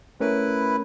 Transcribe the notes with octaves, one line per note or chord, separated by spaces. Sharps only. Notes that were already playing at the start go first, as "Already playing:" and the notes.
A3 C#4 E4 A#4 B4